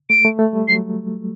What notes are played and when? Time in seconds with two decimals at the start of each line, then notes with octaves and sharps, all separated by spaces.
0.10 A3 D7
0.25 A3
0.39 A3
0.53 G3
0.68 F#3 C7